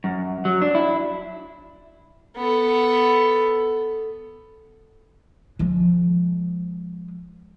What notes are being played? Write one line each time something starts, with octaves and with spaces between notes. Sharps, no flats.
F#2
F#3
D4
E4
B3 A4
F3 G#3